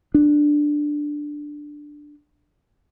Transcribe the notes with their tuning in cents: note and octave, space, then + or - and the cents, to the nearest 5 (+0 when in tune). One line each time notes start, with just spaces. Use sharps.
D4 +5